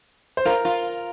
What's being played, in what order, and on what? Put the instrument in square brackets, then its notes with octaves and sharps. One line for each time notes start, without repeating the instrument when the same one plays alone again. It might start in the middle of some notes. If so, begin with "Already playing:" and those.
[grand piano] C5
[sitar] F4 [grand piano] A#4
[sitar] F4